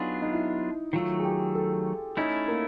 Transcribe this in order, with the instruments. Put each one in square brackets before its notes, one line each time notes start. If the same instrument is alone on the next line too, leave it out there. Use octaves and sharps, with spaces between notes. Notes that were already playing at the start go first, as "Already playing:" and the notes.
Already playing: [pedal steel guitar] F#3 B3 D4 F4 G#4 [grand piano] D#4
[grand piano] D#4
E4
[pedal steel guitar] D#3 F#3 A3 [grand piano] F4
[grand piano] G#4
G4
A4
[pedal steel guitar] A3 C#4 E4 [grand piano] D#4
[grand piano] A#3